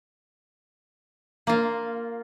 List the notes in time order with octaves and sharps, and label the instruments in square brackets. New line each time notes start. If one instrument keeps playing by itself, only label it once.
[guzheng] A#3 F4